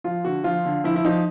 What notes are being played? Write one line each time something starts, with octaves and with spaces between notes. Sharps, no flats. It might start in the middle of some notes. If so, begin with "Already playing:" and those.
F3 F4
D3 F#4
F3 F4
D3
F3 E4
E4
F3 D#4